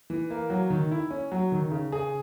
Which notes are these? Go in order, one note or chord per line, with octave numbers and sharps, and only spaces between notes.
E3
A#3
F#3
D#3
E4
C#4
F#3
D#3
C#3
G#4